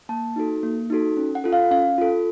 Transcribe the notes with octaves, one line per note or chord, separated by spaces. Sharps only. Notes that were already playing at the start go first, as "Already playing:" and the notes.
A#3 A5
D#4 F#4 A4
A#3
D#4 F#4 A4
C#4
F#5
F4 A4
F5
C#4 F5
F4 A4